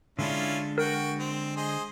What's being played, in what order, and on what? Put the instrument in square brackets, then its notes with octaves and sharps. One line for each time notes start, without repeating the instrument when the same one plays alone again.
[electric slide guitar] D3 G#3 D4 [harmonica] C#4 E4 F4
[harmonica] F#4 G5 [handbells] A#4
[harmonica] C4
G#4 C5 D#5